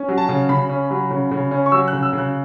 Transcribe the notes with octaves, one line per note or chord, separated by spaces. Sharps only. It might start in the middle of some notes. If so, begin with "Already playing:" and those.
Already playing: C#4
F#3
A5
C#3
C#3 B5
C#4
F#3
C#3
C#3
C#4
C#6
F#3 E6
F#6
C#3
E6
C#3
F#6